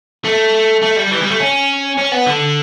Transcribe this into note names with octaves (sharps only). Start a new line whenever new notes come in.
A3
A3
G3
E3
G3
A3
C#4
C#4
B3
D3